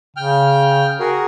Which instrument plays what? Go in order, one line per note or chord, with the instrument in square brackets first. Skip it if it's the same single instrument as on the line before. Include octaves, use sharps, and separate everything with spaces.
[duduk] C#3 [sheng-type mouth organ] G5 F6
[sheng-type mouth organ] F#4 G#4 A#4